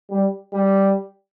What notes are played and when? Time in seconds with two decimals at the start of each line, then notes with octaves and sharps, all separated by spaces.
0.10 G3
0.53 G3